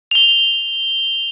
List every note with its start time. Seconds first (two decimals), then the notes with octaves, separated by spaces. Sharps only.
0.11 F7 G7